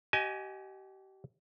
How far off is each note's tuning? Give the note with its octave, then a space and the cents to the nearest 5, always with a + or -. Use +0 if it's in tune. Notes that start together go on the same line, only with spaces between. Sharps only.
G4 -35 D#5 +0 G#5 +10